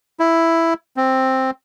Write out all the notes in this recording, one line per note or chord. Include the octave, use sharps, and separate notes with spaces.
E4
C4